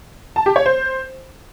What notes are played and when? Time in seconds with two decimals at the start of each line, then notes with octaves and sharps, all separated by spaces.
0.36 A5
0.46 G4
0.56 C#5
0.66 C5